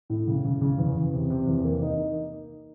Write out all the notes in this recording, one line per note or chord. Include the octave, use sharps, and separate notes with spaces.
A2
C#3
C#3
C#3
E2
E2
C3
C3
E2
A#3
D#4